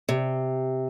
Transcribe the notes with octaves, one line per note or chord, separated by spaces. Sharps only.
C3